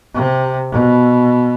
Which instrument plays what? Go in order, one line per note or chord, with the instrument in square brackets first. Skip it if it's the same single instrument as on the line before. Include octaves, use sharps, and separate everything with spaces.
[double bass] C3
B2